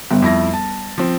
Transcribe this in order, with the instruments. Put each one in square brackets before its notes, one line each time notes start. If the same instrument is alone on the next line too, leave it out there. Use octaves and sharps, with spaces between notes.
[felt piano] G1 [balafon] G3 B3
[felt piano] F2 E4 A#6
A5
F3 C4